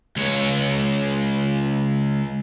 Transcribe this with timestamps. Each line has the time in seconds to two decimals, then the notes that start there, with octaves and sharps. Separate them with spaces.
0.16 C#2 C#5